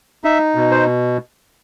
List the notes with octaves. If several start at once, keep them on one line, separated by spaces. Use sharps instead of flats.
D#4 E5
B2
C5